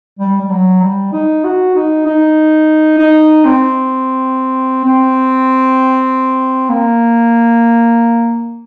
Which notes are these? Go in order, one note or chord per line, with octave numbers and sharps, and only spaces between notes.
G3
G3
F#3
G3
D#4
F#4
D#4
D#4
D#4
C4
C4
A#3